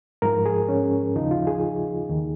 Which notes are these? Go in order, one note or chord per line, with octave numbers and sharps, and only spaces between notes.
G#2 F3 A#4
G#4
C#4
D#2 C#3 F3 D#4
F4
G#4
D#2 D#3